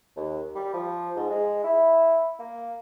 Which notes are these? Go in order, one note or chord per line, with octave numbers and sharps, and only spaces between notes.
D#2
G3
F3
G#2
G#3
E4
A#3